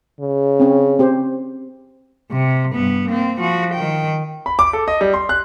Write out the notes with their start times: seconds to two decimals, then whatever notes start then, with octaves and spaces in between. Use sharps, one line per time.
0.20 C#3
0.60 C4 C#4
0.99 C4 G4 C5
2.32 C3
2.73 G2 B3
3.08 A#3 C4
3.41 F3 F#4
3.74 D#3 G5
4.46 B5
4.59 D6
4.73 A4
4.88 D#5
5.01 G3
5.14 C6
5.29 F#6